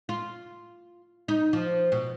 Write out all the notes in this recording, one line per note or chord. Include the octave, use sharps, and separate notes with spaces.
F4
D#4
F3
B2